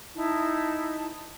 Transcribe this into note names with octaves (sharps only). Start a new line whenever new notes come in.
D#4 E4 A5